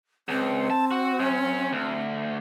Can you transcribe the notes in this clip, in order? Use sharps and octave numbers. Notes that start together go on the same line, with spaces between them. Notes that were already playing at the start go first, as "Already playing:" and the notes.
C#2 C4
A5
F#4
F#2 C#4
D2